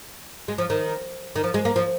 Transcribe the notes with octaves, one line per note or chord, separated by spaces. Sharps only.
G#3
F3
D#3
D#3
F3
G#3
A#3
F3